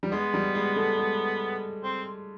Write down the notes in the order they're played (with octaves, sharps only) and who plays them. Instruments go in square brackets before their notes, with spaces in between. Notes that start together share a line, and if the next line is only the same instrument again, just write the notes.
[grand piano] G3
[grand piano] G#3 [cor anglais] B3
[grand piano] G3
G#3
A3
G#3
[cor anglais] C4